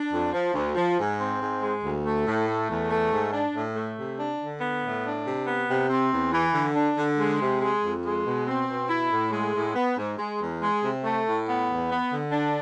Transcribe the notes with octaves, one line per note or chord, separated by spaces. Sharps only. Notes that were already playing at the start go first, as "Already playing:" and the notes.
Already playing: D4
F2
F3
D2
F3
G#2
C4
G#2
G#3
D2
A3
A2
A3
E2
A3
G#2
D4
A2
A3
C3
D4
D3
B3
A2
D4
C3
B3
C3
C4
E2
E3
D3
D4
D3
G#3
C3
G#3
F2
G#3
B2
C4
B2
E4
A2
G#3
A2
B3
G#2
G#3
E2
G#3
C3
A3
A2
B3
E2
B3
D3
D4